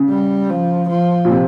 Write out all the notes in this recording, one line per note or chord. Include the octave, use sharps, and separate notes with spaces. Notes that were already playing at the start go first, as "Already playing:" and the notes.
Already playing: C#3
G3
F3
F3
A#2
C3